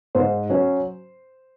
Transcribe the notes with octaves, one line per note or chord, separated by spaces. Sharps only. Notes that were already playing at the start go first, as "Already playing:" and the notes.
G#2 C5
F#3 C#4